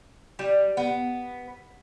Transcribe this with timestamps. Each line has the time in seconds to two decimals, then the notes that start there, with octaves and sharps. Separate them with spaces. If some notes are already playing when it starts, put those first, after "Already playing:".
0.39 G3
0.77 B3